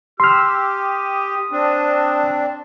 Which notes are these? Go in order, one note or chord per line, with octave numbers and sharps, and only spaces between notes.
G4 C6 E6 F6
D#6
C4 D4